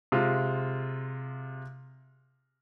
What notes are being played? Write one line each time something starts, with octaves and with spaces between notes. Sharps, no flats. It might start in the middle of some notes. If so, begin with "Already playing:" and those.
C3 G#3 F4